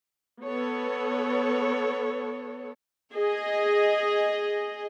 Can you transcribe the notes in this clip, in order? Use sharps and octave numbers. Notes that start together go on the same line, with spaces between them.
B3 A4 C#5
G#4 D#5